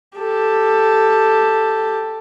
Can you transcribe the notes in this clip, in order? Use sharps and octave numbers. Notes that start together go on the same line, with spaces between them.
G4 A4